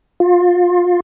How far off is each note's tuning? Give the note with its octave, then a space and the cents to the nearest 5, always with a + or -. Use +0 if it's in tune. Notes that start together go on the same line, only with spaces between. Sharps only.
F4 +25